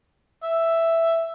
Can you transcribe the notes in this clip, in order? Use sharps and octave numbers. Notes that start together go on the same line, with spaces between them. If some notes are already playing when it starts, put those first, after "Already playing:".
E5